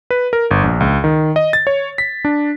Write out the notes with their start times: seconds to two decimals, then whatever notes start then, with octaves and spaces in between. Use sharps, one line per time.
0.11 B4
0.33 A#4
0.51 G1
0.64 A#1
0.80 C#2
1.04 D#3
1.36 D#5
1.53 A6
1.67 C#5
1.98 B6
2.25 D4